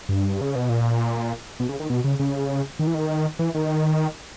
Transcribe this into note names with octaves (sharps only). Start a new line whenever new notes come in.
G2
C#3
B2
A#2
B2
C#3
D#3
B2
C#3
C#3
D#3
E3
D#3
E3
D#3